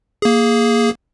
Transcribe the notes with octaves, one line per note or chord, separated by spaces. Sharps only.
A#3 G#4